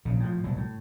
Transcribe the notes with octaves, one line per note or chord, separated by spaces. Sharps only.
A#1 C#3
A2 F3
C2 B2 F#3
A2